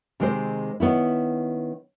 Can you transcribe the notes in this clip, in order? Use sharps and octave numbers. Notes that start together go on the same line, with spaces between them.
C3 D#3 G#3 C4 C5
D#3 B3 C#4 E4